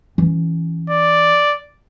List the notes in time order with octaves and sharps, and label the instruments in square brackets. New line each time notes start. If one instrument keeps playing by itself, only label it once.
[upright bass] E3 C#4
[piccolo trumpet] D5